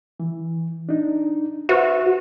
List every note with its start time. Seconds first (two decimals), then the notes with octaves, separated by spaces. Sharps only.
0.20 E3
0.89 D4 D#4
1.69 F#4 B4 C5 E5